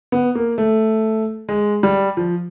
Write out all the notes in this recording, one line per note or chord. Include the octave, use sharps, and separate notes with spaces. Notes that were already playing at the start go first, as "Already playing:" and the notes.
B3
A#3
A3
G#3
G3
F3